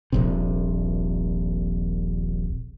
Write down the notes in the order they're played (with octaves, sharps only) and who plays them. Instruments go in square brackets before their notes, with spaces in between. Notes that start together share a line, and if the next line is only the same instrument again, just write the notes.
[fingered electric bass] D#1 A#1 C3